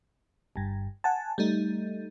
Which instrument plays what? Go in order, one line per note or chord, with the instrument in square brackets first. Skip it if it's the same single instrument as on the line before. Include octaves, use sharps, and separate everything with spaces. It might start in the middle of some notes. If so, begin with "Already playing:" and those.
[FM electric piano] G1 G2
F#5 G#5 A5
G3 A3 D#4